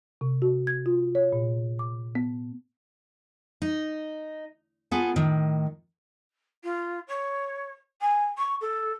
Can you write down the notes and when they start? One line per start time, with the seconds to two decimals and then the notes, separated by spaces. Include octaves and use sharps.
0.21 C3
0.42 F#4
0.67 G#6
0.86 F4
1.15 C#5
1.33 A#2
1.79 D6
2.15 B3
3.62 D#4
4.91 B3 F4 G#4 A4
5.16 A2 D#3
6.63 F4
7.08 C#5
8.01 G#5
8.37 C#6
8.61 A4